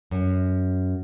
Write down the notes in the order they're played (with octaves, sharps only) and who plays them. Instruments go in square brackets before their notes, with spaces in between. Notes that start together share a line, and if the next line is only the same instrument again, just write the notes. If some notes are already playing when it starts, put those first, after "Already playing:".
[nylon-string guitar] F#2